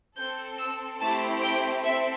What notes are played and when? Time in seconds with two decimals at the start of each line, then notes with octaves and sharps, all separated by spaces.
0.17 C4 A4 G6
0.59 E6
1.00 A3 C4 E4 G4 A5
1.42 G5
1.84 C4 A4 E5